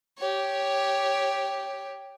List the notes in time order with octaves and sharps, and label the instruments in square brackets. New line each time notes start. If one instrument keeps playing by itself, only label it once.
[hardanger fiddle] G4 C#5